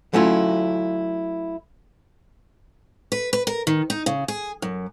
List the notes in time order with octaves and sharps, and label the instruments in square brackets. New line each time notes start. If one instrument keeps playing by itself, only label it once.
[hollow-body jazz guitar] F#3 A3 C#4 E4 F4
[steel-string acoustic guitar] B4
B4
A#4
D#3
D#4
C#3
G#4
F#2